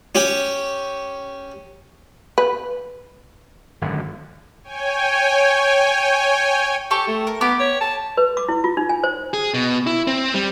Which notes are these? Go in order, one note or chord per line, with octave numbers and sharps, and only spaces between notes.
C#4 G4
B4
G#1 F#2 D3
C#5 G5 G#5
G4 A4 G5 C#6
A3
A#4
B3 G4 D6
C#5
A5
B4
D6
E4
F4
D#4
G#5
C5
G#4
B2
E4
C4
G3